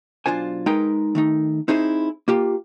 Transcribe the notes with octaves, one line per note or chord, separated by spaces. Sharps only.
B1 A#2 D4 F4 C5 G#5
G#3 D#4 G#4 A#4 B4 G5
D#3 A3 D#4
C4 D#4 E4 G#4 C5
A#3 F4 G4